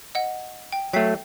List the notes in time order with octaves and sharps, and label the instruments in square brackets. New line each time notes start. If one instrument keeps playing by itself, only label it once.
[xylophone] D#5 F#5
G5
[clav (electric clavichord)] F#3 A3 [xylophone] G5 B6 C7